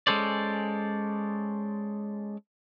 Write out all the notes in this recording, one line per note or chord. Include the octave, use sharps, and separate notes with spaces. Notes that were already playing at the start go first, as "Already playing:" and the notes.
G#3 C#4 A4 C5 D5